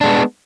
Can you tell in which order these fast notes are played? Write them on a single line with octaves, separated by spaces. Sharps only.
D4 G#3 B3